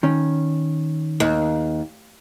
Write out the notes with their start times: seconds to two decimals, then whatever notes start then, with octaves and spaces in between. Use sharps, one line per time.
0.03 D#3 C#4
1.20 D#2